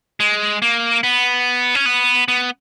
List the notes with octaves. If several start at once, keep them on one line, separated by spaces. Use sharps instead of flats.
G#3
A#3
B3
C#4
B3
B3